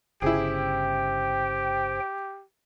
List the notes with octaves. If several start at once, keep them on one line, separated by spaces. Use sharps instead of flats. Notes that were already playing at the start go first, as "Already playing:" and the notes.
G1 C#3 E4 G4 G#4 C5 G5